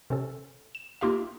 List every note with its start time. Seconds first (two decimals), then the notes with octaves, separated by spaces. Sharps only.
0.10 C3 C#4 A4
0.75 E7
1.01 A#3 D#4 F4 G4 E5 F5